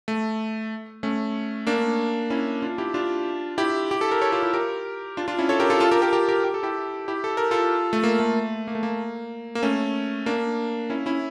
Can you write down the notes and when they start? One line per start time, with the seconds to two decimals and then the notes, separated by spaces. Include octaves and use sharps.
0.08 A3
1.03 A3 C#4
1.67 A#3 D4
2.30 C#4 E4
2.62 D4 F4
2.78 E4 G4
2.94 D4 F4
3.58 E4 G4
3.91 G4
4.01 A4
4.11 A#4
4.22 A4 C#5
4.32 F4 A4
4.43 E4 G4
4.53 G4 A#4
5.17 D4 F4
5.28 D4 F4
5.38 C#4 E4
5.49 A4 C#5
5.60 G4 A#4
5.70 F4 A4
5.80 F4 A4
5.91 G4 A#4
6.02 G4 A#4
6.13 G4 A#4
6.28 G4 A#4
6.44 G4
6.54 A4
6.63 E4 G4
7.08 E4 G4
7.24 A4
7.37 A#4
7.51 F4 A4
7.93 A3
8.03 A#3
8.20 A3
8.67 A#3
8.75 A3
8.83 A#3
9.55 A#3
9.63 A3 C#4
10.26 A#3 D4
10.90 C#4 E4
11.06 C#4 E4